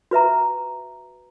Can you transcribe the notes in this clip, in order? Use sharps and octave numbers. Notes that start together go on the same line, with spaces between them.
F#4 B4 E5 A#5